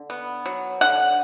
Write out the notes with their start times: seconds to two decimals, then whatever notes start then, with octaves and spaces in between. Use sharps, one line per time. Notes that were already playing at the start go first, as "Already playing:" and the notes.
Already playing: D3
0.10 B3
0.46 F#3
0.81 D3 F#5